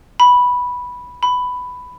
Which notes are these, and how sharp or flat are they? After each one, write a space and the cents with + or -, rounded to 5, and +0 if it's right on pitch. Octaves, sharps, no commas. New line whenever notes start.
B5 -5
B5 +10